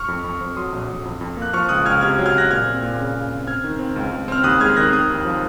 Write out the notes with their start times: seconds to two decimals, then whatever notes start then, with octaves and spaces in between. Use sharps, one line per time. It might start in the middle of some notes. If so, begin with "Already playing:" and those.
Already playing: C#6 F6
0.08 F2
0.24 F2
0.41 F2
0.56 F#3 C6 D#6
0.72 A#1
0.89 A#1
1.05 F2
1.21 F2
1.37 A#3 F#6
1.53 F3 C#6 F6
1.69 C#2 D#6 F#6
1.85 C#2 F6 G#6
2.01 C3 F6 G#6
2.19 F#3
2.26 F6 G#6
2.34 C3 F#6 A#6
2.50 A#2 F6 G#6
2.66 C4
2.82 A#2
2.99 C#3
3.15 C#3
3.31 C4
3.47 C4 F6 G#6
3.64 D#3
3.79 C4
3.96 C#2
4.12 C#2
4.28 C4 F6
4.44 D#2 D#6 F#6
4.60 G#3 F6 G#6
4.77 D#3 F#6 A#6
4.93 C4 D#6 F#6
5.09 D#2
5.25 F3